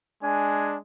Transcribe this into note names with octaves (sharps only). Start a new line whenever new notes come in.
G#3 D4 G#5